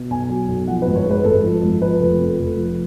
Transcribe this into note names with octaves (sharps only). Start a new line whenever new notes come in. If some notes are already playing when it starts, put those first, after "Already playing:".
Already playing: B2
B1 G#5
F#3
B1
F3 F#5
B4
G#1
C#5
G#2
B4
G#1 A4
F3
G#1
F3 B4
F1
F2
F1
F3